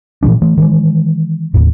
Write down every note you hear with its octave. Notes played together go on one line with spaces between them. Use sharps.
A#2 E3 F3 D4
E3 A3
D#3 E3 G#3
D#2 A2